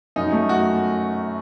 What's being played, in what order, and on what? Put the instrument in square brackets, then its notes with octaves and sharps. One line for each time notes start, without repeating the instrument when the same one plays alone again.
[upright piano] F#2 [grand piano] D#4
[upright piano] A3
[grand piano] F#4